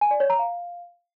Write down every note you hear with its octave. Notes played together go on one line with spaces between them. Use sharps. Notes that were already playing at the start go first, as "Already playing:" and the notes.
G#5
D5
C#5
A#5
F5